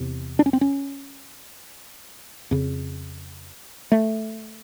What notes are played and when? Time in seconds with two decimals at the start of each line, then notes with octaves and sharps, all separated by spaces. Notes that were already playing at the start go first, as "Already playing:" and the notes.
Already playing: E2 C3
0.39 D4
0.46 C#4
0.53 C4
0.61 C#4
2.51 F2 C#3
3.92 A3